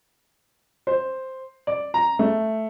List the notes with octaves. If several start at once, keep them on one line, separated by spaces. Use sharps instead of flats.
C5
D5
A#5
A3